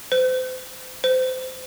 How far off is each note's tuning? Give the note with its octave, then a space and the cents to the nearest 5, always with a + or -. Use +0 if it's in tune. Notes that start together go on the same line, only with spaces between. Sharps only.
C5 -35
C5 -25